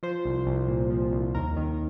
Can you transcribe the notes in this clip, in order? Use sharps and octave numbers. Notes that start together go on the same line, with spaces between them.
F3 C5
C2
C2
A#2
F3
C2
D#2 A#4
D#3